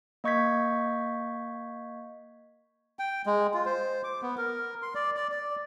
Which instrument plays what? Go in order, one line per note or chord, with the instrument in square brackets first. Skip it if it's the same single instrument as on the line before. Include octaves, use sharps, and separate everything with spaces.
[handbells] A#3 D#5 C#6 G6 G#6 B6
[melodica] G5
G#3
F4
C5
D6
B3
A#4
C6
D5
D5
D5